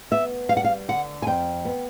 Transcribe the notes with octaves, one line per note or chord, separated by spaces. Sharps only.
B3 E5
G3 F5
F#5
F5
D3 F#5
G#5
F2 G5
B3